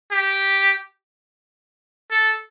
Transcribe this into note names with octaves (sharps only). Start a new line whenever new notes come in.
G4
A4